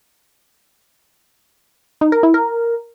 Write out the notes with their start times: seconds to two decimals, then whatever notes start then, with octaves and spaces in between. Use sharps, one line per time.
2.01 D#4
2.12 A#4
2.23 E4
2.34 A#4